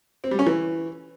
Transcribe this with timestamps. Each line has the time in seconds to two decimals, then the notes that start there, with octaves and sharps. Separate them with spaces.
0.24 C4
0.31 G3
0.39 C#4
0.46 E3